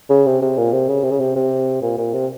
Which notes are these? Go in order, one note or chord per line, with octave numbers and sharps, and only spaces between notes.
C#3
C3
C3
A#2
C3
C#3
C3
C#3
C3
C3
A#2
A#2
C3